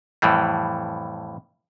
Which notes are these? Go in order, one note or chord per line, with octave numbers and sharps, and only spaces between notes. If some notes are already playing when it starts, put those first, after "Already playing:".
F2 A2 E3 G3